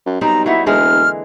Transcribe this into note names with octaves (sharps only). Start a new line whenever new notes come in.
F#2
B1 G3 C4 D#4 A#5
F#3 A#3 D#4 E4 E5 F#5
E1 D3 E3 G#3 F6